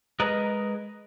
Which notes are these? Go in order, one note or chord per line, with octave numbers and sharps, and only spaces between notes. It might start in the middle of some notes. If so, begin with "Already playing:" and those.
G#3 G#4 A#4 B4 D#5